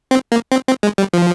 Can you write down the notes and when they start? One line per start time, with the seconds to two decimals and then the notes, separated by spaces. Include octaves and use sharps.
0.11 C4
0.32 A#3
0.52 C4
0.67 C4
0.83 G#3
0.98 G3
1.13 F3